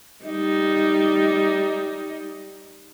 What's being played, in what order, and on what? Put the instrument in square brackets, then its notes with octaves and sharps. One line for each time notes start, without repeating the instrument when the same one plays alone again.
[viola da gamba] G3 D#4